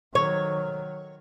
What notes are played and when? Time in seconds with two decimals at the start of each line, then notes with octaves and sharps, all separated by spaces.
0.15 D#3 F#3 C#5